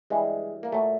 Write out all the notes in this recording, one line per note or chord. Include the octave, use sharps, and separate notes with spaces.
G2 E3 G3 G#3
A#3
A#2 F#3 A3